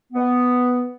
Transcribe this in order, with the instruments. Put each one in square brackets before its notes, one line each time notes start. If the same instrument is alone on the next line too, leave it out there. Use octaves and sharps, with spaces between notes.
[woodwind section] B3